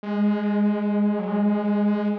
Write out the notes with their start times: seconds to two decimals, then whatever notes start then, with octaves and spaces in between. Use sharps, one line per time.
0.03 G#3
1.19 F#3
1.28 G#3